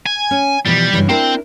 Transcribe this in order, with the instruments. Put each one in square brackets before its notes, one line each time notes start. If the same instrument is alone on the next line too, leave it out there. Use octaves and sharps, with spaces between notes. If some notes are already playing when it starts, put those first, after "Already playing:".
[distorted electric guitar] G#5
[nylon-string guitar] C#4
[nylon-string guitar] B2 E3 F3 [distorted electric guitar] G3
[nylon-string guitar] G2 C#3 E3
[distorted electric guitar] C4 [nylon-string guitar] D4 E4 A#4